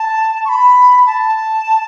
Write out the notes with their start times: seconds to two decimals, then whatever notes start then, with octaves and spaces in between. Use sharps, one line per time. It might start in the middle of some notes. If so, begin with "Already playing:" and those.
Already playing: A5
0.45 C#6
0.49 B5
1.06 A5